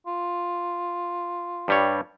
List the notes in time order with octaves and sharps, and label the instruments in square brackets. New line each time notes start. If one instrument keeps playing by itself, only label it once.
[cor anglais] F4
[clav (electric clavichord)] G2 G3 C#5